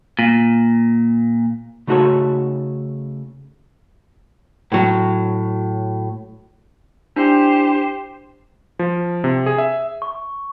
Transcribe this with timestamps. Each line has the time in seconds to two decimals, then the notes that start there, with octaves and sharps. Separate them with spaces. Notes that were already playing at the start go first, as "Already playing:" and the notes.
0.19 A#2
1.87 C#3 A3 D#4 F#4 A4 C#5
4.72 A2 F#3
7.16 D4 E4 G4 C5
8.79 F3
9.24 C3
9.46 G#4
9.58 E5
10.02 C#6